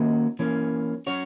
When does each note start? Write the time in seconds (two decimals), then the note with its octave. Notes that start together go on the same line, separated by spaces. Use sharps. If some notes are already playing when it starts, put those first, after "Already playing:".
Already playing: D#3 A#3 C#4 F#4
0.39 E3 A#3 C#4
1.07 F#3 C#4 F#4 C#5